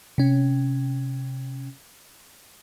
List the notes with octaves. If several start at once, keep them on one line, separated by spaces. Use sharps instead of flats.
C3 C#4